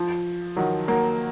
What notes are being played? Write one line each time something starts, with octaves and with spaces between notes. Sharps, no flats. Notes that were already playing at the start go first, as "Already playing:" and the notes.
Already playing: F3
D#3 F#3
F#3 A#3